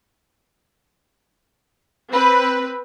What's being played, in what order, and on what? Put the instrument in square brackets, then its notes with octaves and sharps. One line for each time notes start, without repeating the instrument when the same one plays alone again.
[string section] C4 B4